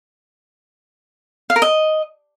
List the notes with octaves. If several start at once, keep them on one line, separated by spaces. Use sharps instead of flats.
F5
A#4
D#5